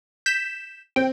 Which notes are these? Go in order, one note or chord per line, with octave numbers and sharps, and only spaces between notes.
G6 B6 E7
C4 G5